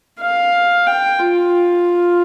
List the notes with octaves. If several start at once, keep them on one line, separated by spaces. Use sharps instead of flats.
F5
G5
F4